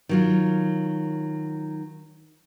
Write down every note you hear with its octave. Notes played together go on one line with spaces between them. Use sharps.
D#3 F#3 F4